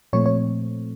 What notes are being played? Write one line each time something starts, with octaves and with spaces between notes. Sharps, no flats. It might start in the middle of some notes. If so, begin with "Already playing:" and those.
A#2 F3 A3 C4 C#5
C#5